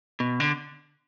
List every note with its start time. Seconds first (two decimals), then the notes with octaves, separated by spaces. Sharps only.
0.20 B2
0.40 D3